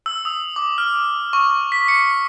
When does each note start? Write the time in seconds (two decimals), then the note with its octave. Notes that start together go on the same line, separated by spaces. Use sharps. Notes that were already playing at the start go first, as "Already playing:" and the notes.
0.06 E6
0.25 D#6
0.56 D6
0.78 F6
1.33 C#6
1.72 B6
1.88 C#7